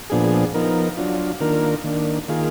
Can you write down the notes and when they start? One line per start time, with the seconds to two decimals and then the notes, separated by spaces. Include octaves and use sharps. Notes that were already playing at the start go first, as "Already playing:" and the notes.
0.10 A#2 F3 B3 D4 G#4
0.54 F3 B3 D#4 A#4
0.97 F#3 D4 F4
1.41 D#3 A#3 D4 F4 A#4
1.84 D#3 A#3 D4
2.28 D#3 A#3 F4 G#4